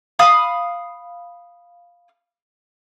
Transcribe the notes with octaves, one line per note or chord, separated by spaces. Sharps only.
F5 B5 D#6